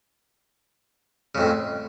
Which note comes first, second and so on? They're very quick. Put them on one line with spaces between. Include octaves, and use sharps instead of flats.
C#3 F2 A2